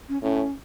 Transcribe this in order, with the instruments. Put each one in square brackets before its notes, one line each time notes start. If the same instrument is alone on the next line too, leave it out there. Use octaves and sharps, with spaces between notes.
[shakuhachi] C#4
[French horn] A2 [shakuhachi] C#4